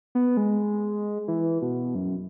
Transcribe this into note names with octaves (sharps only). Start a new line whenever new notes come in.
B3
G#3
E3
B2
F#2